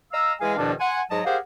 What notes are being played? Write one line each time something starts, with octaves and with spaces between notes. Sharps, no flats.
D#5 F5 A#5 E6
E3 G#3 G#4 F5 G#5
E2 B2 D#3 F3 D4
F#5 G#5 C6
G#2 F#3 D#5 A5
G4 G#4 A#4 C5 F5 F#5